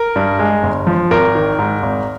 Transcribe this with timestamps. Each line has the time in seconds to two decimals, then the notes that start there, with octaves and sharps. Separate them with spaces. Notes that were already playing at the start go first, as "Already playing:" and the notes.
Already playing: A#4
0.16 G2
0.39 G#3
0.63 G1
0.87 F3
1.11 G#1 A#4
1.35 D#3
1.59 G#2
1.83 G#1